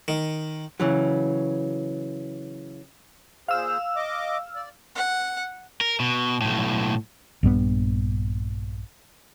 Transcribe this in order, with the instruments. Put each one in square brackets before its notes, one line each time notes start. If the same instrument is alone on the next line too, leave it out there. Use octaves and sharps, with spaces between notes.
[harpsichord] D#3
[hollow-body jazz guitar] C#3 E3 F#3
[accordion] A#2 G#4 C5 [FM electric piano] F5 E6 F6
[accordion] D#5 D6
D5
[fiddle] F#5
[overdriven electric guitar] A#4
B2
B1 A2
[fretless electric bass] A#1 G2 G3 B3